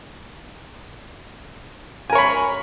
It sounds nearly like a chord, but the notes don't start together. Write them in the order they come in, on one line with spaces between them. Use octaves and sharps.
G#5 A#4 C#5 B5